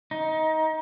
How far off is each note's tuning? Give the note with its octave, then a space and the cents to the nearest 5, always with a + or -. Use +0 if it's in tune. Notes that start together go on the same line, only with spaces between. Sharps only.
D#4 +20